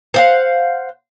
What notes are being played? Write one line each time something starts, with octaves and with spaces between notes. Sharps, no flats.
C5 F5 F#5